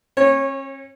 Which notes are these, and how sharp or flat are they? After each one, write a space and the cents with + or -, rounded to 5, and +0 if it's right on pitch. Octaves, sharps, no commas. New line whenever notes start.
C#4 -45 C#5 -20